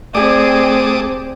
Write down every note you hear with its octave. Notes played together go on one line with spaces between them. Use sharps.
A3 C4 G4 G#4 D5 D6 D#6